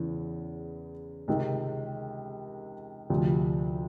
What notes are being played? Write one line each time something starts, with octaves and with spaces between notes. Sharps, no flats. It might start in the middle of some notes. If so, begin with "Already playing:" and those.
Already playing: E2 C#3 E3
C#2 C3 D#3
D2 C3 F3